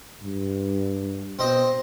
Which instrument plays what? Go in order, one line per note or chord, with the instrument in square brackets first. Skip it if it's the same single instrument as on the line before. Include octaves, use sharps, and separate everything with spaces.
[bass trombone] G2
[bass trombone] B2 [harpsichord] C4 C5 D#5